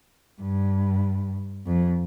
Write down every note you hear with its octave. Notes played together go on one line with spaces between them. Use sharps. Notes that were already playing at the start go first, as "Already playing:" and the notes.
G2
F2